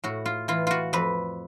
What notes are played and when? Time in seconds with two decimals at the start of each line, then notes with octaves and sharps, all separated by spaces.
0.04 A2 F#4
0.26 F4
0.48 E3 F4
0.67 F4 F#4
0.93 F2 B4